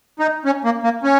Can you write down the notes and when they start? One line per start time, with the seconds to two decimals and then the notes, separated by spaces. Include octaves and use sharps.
0.19 D#4
0.45 C#4
0.65 A#3
0.84 A#3
1.03 C#4